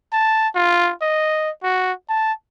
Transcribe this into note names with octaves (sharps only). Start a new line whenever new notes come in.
A5
F4
D#5
F#4
A5